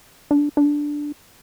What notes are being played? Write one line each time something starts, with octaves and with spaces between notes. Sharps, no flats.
D4
D4